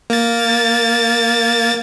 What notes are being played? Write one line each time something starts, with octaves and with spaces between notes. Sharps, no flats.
A#3 A6